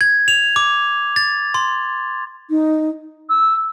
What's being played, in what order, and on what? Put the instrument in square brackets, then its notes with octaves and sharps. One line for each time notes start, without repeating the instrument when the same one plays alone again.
[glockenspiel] G#6
F7
D6
A6
C6
[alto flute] D#4
[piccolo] E6